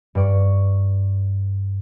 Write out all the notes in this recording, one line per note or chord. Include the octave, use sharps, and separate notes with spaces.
G2 D5 C#6